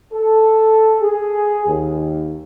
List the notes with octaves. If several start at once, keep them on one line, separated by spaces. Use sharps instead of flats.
A4
G#4
D#2